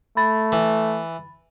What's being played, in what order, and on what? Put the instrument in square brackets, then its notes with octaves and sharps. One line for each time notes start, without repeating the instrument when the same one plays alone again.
[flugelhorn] A3 [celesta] B5 A6
[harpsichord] E3